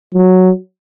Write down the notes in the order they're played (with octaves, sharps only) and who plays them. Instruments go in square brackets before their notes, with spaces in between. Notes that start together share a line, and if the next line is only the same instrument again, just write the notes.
[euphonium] F#3